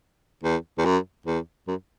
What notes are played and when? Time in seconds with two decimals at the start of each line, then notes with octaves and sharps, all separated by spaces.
0.44 E2
0.78 E2
0.85 F#2
1.26 E2
1.67 F#2